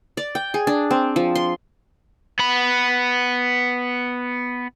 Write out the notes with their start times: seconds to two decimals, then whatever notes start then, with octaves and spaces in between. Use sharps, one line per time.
0.17 D5
0.35 G5
0.54 G#4
0.67 D4
0.91 C4
1.16 F3
1.35 C6
2.39 B3 B5